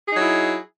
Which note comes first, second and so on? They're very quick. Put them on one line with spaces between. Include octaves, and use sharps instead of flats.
G#4 D#4 F#3 E4